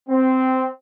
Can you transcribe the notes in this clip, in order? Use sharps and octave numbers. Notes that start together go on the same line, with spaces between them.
C4